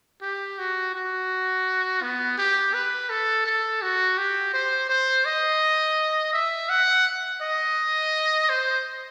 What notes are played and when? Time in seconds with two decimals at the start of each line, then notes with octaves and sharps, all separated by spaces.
0.22 G4
0.59 F#4
0.94 F#4
2.02 B3
2.38 G4
2.74 B4
3.10 A4
3.46 A4
3.82 F#4
4.18 G4
4.54 C5
4.90 C5
5.25 D#5
6.33 E5
6.69 F#5
7.41 D#5
8.49 C5